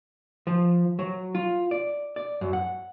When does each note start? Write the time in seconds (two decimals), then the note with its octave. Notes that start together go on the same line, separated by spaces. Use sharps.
0.47 F3
0.99 F#3
1.35 F4
1.71 D5
2.16 D5
2.41 F#2
2.53 F#5